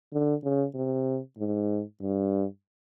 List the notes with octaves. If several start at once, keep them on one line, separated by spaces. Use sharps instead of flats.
D3
C#3
C3
G#2
G2